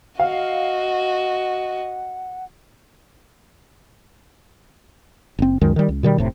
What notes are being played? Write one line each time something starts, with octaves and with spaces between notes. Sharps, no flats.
F#4 D#5 F5 F#5
F#1 C4
C#2 F#2 D#3 G#3
D#3 G3
C#2
B2 D#3 G3
F1 A2 C3